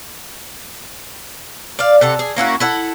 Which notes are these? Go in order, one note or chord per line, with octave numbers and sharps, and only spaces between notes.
D5 F5
C3 A4 F#5
G#4
A#3 C#4 E4 F#4
E4 A4 F#5